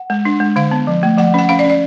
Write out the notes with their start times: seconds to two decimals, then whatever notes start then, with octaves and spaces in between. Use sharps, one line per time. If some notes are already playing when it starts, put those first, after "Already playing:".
Already playing: F#5
0.10 G#3
0.25 D4
0.40 G#3
0.56 D3 F5
0.71 B3
0.87 F3
1.03 A3
1.18 F3 F#5
1.34 C#4 F#5
1.49 C#4 F5
1.59 D5
1.65 C#4
1.70 D5